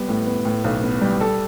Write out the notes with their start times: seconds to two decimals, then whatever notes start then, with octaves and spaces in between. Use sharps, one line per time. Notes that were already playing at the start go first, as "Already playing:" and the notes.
Already playing: G3 B3
0.09 A2
0.27 B3
0.45 A2
0.64 B1
0.83 B3
1.01 G3
1.21 A4